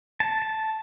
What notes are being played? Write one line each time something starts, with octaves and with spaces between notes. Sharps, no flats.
A5
A5